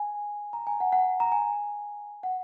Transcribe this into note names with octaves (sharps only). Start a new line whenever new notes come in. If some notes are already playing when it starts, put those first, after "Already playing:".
Already playing: G#5
A#5
G#5
F#5
F#5
A#5
G#5
F#5